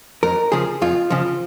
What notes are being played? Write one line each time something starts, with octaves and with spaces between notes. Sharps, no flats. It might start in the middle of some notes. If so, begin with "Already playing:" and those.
F2 A#4
C#3 F3 G#4
F2 F4
C#3 F3